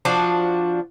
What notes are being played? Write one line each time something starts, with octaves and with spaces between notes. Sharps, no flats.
F3 D4 F#4